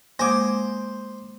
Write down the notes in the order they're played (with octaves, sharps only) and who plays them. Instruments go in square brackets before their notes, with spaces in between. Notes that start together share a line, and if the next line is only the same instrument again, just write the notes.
[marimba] G#3 A#3 [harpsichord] C5 [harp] G#5 D6 D#6